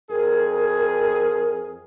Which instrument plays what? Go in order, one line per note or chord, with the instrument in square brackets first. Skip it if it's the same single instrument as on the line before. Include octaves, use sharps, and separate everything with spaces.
[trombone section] F2 G#4 [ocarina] A#4